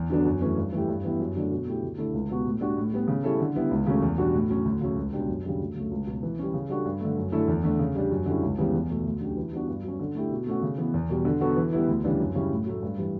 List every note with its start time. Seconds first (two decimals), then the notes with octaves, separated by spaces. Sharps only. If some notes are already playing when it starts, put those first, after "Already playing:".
Already playing: E2
0.10 D3 F#3 B3 D4
0.25 F#2
0.41 E3 A3 C#4
0.57 G2
0.72 E3 A3 E4 G4
0.89 G2
1.04 E3 B3 E4 G4
1.20 F#2
1.36 D3 F#3 A3 D4
1.51 B2
1.66 A3 E4 G4
1.82 D2
1.98 D3 A3 E4 A4
2.14 C#2
2.30 B2 G3 B3 F#4
2.46 A2
2.61 G3 D4 F#4
2.77 A2
2.92 G3 B3
3.08 C#3
3.24 G3 C#4 E4 A4
3.40 D3
3.55 G3 B3 E4
3.71 C#2
3.86 C#3 F#3 A3 C#4
4.02 E2
4.18 B2 G3 D4 F#4
4.34 A2
4.49 F#3 C#4
4.65 D2
4.81 C#3 F#3 A3 C#4
4.96 C#2
5.13 B2 G3 D4 G4
5.28 F#2
5.44 C#3 G3 D4
5.60 D2
5.76 C#3 F#3 A3
5.91 C#2
6.07 B2 F#3
6.23 E3
6.39 G3 C#4
6.54 C#3
6.70 G3 D4 F#4 A4
6.85 G2
7.01 D3 A3
7.17 F#2
7.32 D3 A3 E4 A4
7.48 E2
7.64 D3 A3
7.79 C#3
7.95 G3 D4 G4
8.11 F#2
8.26 D3 G3 C#4 E4
8.43 C#2
8.58 C#3 E3 G3 B3
8.74 E2
8.90 B2 A3
9.05 D2
9.21 D3 F#3 C#4 G4
9.37 E3
9.52 G3 B3 D4 F#4
9.68 G2
9.84 F#3 C#4
10.00 D3
10.15 A3 E4 G4
10.31 B2
10.47 A3 C#4 F#4
10.62 C#3
10.78 E3 B3
10.94 E2
11.09 B2 G3
11.25 D3
11.41 F#3 B3 F#4 A4
11.57 E3
11.72 G3 B3 E4
11.88 D2
12.04 C#3 E3 G3 D4
12.20 F#2
12.35 C#3 G3 C#4 E4
12.51 A2
12.66 F#3 A3
12.83 G2
12.98 E3 G3